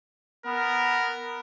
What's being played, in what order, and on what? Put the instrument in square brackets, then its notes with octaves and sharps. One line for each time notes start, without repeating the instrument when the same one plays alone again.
[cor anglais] B3 [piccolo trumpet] A#4